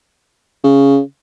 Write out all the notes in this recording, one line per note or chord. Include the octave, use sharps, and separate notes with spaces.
C#3